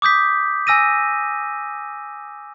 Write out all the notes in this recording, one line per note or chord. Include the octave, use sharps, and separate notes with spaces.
D6 D#6 G6 B6
G#5 E6 A#6 D#7